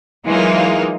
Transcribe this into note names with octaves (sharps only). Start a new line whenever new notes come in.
E3 F#3 G#3 A#3 D#4 F4